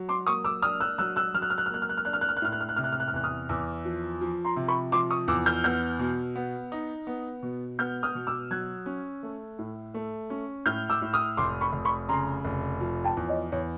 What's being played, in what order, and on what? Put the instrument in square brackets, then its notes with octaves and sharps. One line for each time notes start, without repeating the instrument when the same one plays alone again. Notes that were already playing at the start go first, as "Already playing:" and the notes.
Already playing: [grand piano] F#3
[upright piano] C6 D6
[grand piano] A#3 [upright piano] C#6 D#6
[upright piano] D6 E6
[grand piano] D4 [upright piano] D#6 F6
[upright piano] E6 F#6
[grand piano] F#3 [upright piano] E6 F#6
[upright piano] E6 F#6
[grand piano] F#3 [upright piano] F6
[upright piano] F#6
F6
F#6
F6
[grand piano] A#3 [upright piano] F#6
[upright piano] F6
F#6
F6
[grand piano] D4 [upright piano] F#6
[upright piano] F6
F#6
F6
F#6
[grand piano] A2 [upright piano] F6
[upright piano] F#6
F6
F#6
[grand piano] C3 [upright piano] F6
[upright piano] F#6
F6
F#6
F6
[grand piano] E2 [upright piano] F#6
[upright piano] D#6 F6
[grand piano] E2 [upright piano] D6 E6
[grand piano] F3
F3
[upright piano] A#5 C6
[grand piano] C3
[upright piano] B5 C#6
[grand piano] F3 [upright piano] C6 D6
[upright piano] C#6 D#6
[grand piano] E2 [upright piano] D6 E6
[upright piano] F6 G6
[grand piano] B3 [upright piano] F6 G6
[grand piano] B2
B3
D#4
B3
B2
[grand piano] B3 [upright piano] F6 G6
[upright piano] D#6 F6
[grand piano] B2
[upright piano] D6 E6
[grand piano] F#3 [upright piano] F#6 G#6
[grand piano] C#4
A3
A2
A3
C#4
[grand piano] A2 [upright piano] F6 G6
[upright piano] D6 E6
[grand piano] A2
[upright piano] D#6 F6
[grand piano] F1 [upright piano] C6 D6
[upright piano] B5 C#6
[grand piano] F1
[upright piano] B5 C#6
[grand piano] C#3 [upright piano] A#5 C6
[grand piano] F1
F3
[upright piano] G5 A5
[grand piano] E2
[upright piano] C#5 D#5
[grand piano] E2 [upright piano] C#5